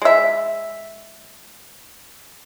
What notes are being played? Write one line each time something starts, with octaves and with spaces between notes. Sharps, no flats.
G#3 E5